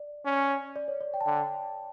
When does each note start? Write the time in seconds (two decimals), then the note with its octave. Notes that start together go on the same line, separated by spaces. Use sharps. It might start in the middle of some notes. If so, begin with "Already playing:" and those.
Already playing: D5
0.25 C#4
0.76 D5
0.88 C#5
1.01 D5
1.14 G5
1.21 A5
1.26 D3 G5